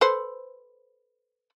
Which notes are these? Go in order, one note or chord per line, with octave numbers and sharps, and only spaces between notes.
A4 B4 C5